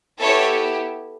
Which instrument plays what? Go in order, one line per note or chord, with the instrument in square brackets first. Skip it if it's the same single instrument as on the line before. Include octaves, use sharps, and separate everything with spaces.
[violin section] B3 E4 G4 A4 C#5